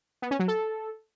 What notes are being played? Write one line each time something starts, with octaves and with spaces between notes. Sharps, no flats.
B3
C#4
F#3
A4